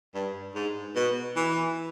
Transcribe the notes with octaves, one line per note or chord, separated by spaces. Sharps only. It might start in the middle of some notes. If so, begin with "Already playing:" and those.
G2
G#2
B2
E3